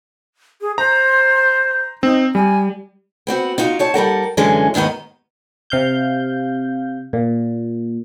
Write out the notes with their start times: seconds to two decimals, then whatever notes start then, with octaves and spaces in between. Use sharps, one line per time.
0.61 G#4
0.78 C5 A#5
2.03 C4 D#4
2.35 G3 G#5
3.27 B3 C4 F#4 F#5
3.58 D#4 F4 F#4
3.79 C4 C#5 A5
3.94 G3 A4 A#4 F#5
4.37 F#2 D3 E3 G#3 C#4
4.74 D#2 G#2 D#3 B3 D#5
5.70 C3 F5 G6
7.13 A#2